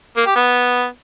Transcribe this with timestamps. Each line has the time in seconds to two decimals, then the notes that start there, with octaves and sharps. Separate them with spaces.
0.17 A#3
0.26 G4
0.36 B3